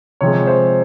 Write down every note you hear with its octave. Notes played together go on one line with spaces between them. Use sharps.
C3 F3 G#3 C#5
C5